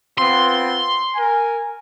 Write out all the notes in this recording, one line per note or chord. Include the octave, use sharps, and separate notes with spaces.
B3 C4 F4 C6
A#4 G#5